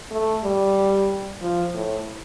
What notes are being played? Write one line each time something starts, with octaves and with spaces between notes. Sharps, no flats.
A3
G3
F3
A2